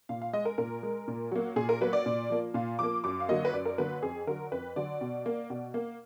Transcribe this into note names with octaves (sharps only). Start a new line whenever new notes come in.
A#2 F5
F5
G#3 D#5
A#4
A#2 A#4
G#3
A#2
F#3 A#3
A#2 G#4
A#4
F#3 A#3 B4
D5
A#2
F3 A#3
A#2 F5
F3 A#3 D6
F#2 D6
F5
D3 F#3 A#3 D#5
B4
F#2 D5
A#4
D3 F#3 A#3 B4
F2 G#4
D3 F#3 A#4
F2 B4
D3 F#3 D5
B2
A#3
B2
A#3